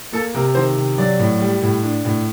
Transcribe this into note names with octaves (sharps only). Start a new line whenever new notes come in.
A#3 A4
C3 A#4
D#3 C5
C3
F#3 D5
A2
G3
A2
D4
A2